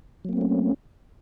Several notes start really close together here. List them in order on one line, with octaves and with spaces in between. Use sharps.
F#3 A#3 C4 A3 C#4